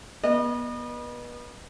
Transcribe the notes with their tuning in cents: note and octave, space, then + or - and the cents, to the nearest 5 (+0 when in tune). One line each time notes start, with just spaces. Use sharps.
B3 -30 D#5 -40